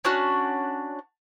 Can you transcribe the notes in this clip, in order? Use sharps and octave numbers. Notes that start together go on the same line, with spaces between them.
C#4 D4 F#4